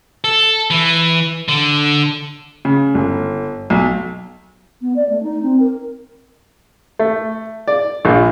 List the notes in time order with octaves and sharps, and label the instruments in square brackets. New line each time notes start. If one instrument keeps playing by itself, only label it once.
[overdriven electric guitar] A4
E3
D3
[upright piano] C#3
G1
B1
[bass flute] B3
D5
A3
D#4
C4
A#4
[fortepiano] A3
D5
A#1